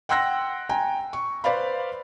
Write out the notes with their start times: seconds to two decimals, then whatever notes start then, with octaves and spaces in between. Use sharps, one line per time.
0.09 F#5 G5 C6 E6 F#6 A#6
0.69 G5 G#5 A#5
1.13 C#6
1.44 B4 C5 D5 F5 B5